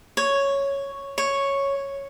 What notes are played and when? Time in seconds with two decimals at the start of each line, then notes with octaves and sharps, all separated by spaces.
0.17 C#5
1.18 C#5